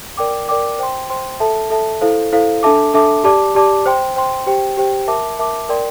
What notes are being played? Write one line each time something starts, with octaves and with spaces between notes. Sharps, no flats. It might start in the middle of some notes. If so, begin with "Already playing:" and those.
A#4 D5 G5 D6
A#4 D5 G5 D6
C5 G5 C6
C5 G5 C6
A4 E5 A5
A4 E5 A5
E4 A4 C5 F5
E4 A4 C5 F5
D4 A4 E5 A5 D6
D4 A4 E5 A5 D6
G4 D5 A5 D6
G4 D5 A5 D6
C5 G5 C6
C5 G5 C6
G4 C5 G5
G4 C5 G5
A#4 E5 A5 D6
A#4 E5 A5 D6
A#4 D5 G5 C6